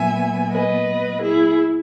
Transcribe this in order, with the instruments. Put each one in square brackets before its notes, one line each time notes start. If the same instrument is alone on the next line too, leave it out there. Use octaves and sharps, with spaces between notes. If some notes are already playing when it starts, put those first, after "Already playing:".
Already playing: [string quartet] A#2 F#3 B3 E5 G#5
B4 D#5
E4 G#4